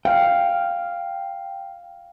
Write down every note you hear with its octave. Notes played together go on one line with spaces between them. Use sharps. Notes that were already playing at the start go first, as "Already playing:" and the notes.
F5 G5